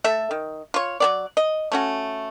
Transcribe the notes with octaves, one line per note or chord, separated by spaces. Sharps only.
A3 A4 E5
D#3
F4 C#5
F#3 B3 D5
D#5
A3 C#4 F#4